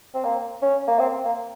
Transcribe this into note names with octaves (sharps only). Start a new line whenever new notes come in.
C4
A#3
C#4
A#3
C4
A#3